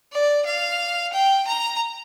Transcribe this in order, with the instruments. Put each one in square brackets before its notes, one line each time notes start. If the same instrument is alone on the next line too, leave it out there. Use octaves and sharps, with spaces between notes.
[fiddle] D5
F5
G5
A#5